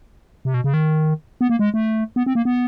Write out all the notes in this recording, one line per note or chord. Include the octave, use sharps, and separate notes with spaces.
C3
B2
C#3
D#3
B3
A#3
G#3
A3
B3
C4
A#3
B3